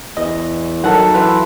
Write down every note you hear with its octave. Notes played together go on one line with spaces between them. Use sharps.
E2 D#5
D#3 F#3 A4 F#5
E3 E4 F4 B4